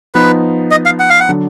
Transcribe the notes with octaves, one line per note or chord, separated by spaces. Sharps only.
F3 B3 D#4 B4
D#5
F5
F#5
F5
F#5
D3 F#3 D4